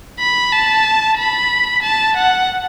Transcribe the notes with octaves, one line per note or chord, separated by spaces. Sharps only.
B5
A5
B5
A5
F#5